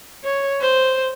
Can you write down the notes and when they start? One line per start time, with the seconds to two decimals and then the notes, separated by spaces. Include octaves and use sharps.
0.24 C#5
0.61 C5